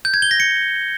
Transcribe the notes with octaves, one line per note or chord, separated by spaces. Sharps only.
G6
G#6
G7
A#6
C#7